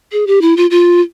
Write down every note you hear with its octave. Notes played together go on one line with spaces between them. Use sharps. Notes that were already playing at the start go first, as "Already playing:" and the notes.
G#4
G4
E4
F4
F4